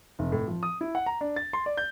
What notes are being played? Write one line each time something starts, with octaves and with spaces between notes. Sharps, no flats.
F1
A2
F3
D#6
E4
F#5
A#5
D4
A6
C6
D5
G6